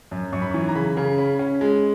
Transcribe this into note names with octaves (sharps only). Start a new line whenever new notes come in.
F#2
F#2 C#6
B5
C#6
E3
A#5
C#3 B5
C#3
C#4 B5
C#4
G#3